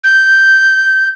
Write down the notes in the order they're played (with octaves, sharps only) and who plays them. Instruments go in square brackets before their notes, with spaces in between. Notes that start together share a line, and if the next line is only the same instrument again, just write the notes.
[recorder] G6